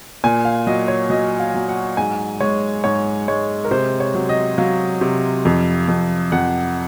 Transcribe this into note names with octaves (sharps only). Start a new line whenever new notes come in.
A#2 G#5
F5
F#3 D#5
C#5
F#3 D#5
F5
F#3
F#5
G#2 G#5
G#3 C#5
G#2 C#5
G#3 C#5
A#4
C3 C5
C#5
F#3
D#5
F#3 F5
C3
F2
F2
F2 F#5